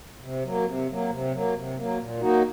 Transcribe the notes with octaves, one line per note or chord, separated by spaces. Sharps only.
C3
F#3 A#3
C3
F#3 A#3
C3
F#3 A#3
C3
F#3 A#3
A#2
F#3 A#3 D#4 F#4